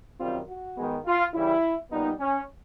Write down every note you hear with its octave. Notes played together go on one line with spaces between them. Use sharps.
F#2 D#3 G3 C4 F4
F#4
G#2 D#3 G#3 B3
F4
C#3 E3 G3 E4
A#2 G3 B3 D#4
C#4